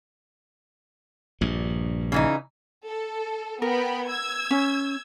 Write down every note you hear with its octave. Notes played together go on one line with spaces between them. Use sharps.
A#1 G2
C#3 E3 D#4
A4
B3 A#4 G5 B5
E6 G#6
C#4